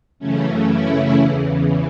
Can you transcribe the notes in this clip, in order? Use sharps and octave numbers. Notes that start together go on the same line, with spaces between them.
F#2 C#3 E3 A3 C#4
C#4 E4
E2 C#3 E3